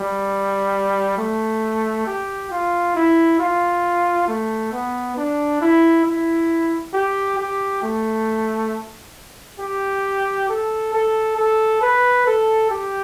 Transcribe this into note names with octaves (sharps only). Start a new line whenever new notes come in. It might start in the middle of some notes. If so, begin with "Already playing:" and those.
Already playing: G3
A3
G4
F4
E4
F4
A3
B3
D4
E4
E4
G4
G4
A3
G4
A4
A4
A4
B4
A4
G4